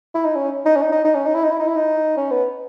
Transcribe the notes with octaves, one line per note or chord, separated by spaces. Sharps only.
E4
D#4
C#4
D#4
C#4
D#4
D#4
D#4
C#4
D#4
E4
D#4
E4
D#4
E4
D#4
C#4
B3